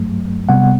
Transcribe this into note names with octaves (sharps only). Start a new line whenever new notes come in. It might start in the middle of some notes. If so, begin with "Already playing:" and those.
Already playing: G2 F#3 A3
C3 G3 B3 F#5